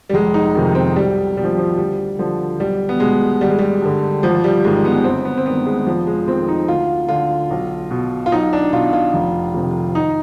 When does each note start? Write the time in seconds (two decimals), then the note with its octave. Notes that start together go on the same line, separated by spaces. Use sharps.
0.09 G3
0.14 F1 G#3
0.34 D#4
0.55 F2 C3 D#3
0.75 C4
0.96 B1 G3
1.36 B2 G3
1.44 F3
1.57 F3
1.77 D2 G3
2.19 D3 F3
2.60 B1 G3
2.89 B3
3.00 B2 G#3
3.41 G#1 G3
3.50 G#3
3.59 G3
3.81 G2 D3
4.23 G#1 F3
4.44 G3
4.64 G#2 D#3 G#3
4.75 G#3
4.85 B3
5.04 G1 C4
5.25 B3
5.38 C4
5.45 G2 D#3 B3
5.66 G#3
5.87 F1 F3
6.07 G#3
6.27 F2 D#3 C4
6.48 D#4
6.68 D2 F4
7.09 D3 F4
7.50 B1
7.91 B2
8.26 F4
8.32 B1 D#4
8.53 D4
8.72 B2 F4
8.93 F4
9.14 F1
9.54 F2 C3 D#3
9.95 G#1 D#4